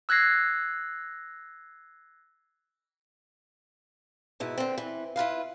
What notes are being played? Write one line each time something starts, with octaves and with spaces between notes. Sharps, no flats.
E6 F#6 G#6 A#6 C7
G#2 B2 E4
D3 C4
E3
E4 F4 B4 F5